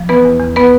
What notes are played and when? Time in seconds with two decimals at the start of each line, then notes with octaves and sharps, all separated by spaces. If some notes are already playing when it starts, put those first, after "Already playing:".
Already playing: F3
0.09 E3 B3 B4
0.25 E2
0.40 E2
0.56 B3 B4